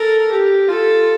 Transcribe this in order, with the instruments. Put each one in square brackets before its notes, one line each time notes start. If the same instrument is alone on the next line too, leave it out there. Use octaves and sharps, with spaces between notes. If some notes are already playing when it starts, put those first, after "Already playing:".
Already playing: [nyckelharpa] A4 [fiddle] A#4
[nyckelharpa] G4
[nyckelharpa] F4 [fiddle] A4